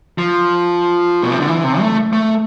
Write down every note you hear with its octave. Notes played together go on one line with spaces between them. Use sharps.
F3
B2
C3
D3
E3
C3
A3
A3